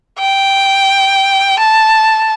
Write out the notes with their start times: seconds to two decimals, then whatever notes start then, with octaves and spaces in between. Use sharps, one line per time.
0.19 G5
1.59 A5